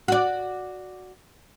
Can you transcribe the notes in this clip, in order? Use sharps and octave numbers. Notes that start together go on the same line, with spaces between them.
F#4 D5